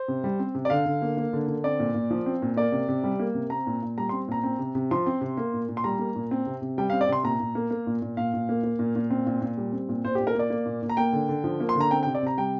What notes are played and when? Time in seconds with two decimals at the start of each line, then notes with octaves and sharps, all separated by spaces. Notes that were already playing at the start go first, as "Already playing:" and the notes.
Already playing: C5
0.08 C3
0.24 G3
0.39 C4
0.55 C3
0.65 D5
0.70 D3 F5
0.85 D3
1.02 A#3
1.17 A#3
1.33 D3
1.48 D3
1.64 C4 D5
1.80 A#2
1.95 A#2
2.10 F3
2.26 C4
2.42 A#2
2.57 A#3 D5
2.72 C3
2.89 C3
3.04 G3
3.20 A#3
3.34 C3
3.50 C4 A#5
3.67 A#2
3.82 A#2
3.98 G3 A#5
4.09 C4 C6
4.28 A#2 A#5
4.43 C4
4.59 C3
4.75 C3
4.91 F3 C6
5.06 C4
5.21 C3
5.37 A#3
5.53 A#2
5.69 A#2
5.77 C6
5.84 G3 A#5
5.99 A#3
6.16 A#2
6.31 C4
6.46 C3
6.62 C3
6.78 G3 G5
6.90 C4 F5
7.01 D5
7.09 C3 C6
7.24 A#2 A#5
7.40 A#2
7.55 A#3
7.71 A#3
7.87 A#2
8.02 A#2
8.17 A#2 F5
8.34 A#2
8.49 A#3
8.63 A#3
8.79 A#2
8.96 A#2
9.10 C4
9.27 A#2
9.41 A#2
9.58 G3
9.72 C4
9.89 A#2
10.05 A#2 C5
10.15 G4
10.20 A#2
10.27 A#4
10.35 A#3 D5
10.50 A#3
10.66 A#2
10.83 A#2
10.89 A#5
10.97 A#3 G5
11.13 D3
11.29 D3
11.44 F3
11.60 A#3
11.69 C6
11.75 D3
11.81 A#5
11.91 C4 G5
12.03 C3 G5
12.14 D5
12.23 C3 A#5
12.38 G3 G5